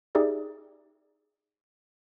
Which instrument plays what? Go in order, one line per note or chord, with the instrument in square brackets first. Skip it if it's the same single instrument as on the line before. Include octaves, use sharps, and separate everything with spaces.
[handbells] D#4 G4 G#4 D5 E5